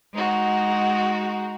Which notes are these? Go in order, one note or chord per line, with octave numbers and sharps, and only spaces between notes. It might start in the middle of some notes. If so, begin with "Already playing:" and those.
G#3 D#4 F#4